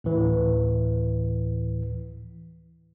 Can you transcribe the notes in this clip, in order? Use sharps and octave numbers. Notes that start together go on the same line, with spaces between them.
D2 A2 E3